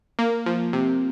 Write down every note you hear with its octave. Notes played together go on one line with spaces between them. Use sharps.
A#3
F3
C3